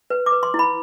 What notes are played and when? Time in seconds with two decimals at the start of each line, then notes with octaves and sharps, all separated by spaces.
0.10 B4
0.26 D6
0.32 B4
0.43 C6
0.54 E4
0.59 B5